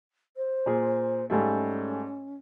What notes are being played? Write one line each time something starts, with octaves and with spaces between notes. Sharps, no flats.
C5
A#2 G#4
G#2 G3 A3 C#4